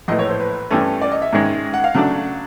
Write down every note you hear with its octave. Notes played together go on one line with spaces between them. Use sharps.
A#1 A2 E3 A3 D#5
C#5
C5
B4
G2 E3 A3 C#4
D5
D#5
E5
G#2 D#3 G#3 C#4
F#5
F5
C#3 F#3 A3 D4 F#5